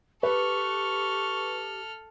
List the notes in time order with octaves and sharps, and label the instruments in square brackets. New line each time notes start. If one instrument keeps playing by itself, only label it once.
[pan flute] G4 [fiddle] A4 F6 [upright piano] B4 [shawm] C#6